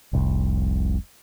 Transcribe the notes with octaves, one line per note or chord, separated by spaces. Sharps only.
F1 C2